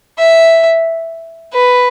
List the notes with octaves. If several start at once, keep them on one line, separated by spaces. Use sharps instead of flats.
E5
B4